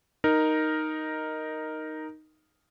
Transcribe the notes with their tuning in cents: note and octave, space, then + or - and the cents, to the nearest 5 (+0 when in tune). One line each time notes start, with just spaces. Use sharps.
D#4 +0 A#4 +0